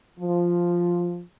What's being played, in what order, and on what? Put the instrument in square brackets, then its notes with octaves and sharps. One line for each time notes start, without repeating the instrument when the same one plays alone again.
[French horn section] F3